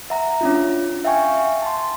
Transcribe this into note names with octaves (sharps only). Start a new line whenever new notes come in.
E5 F#5 A#5
C#4 D4 F4
E5 F5 G5 G#5 C#6
A5 C6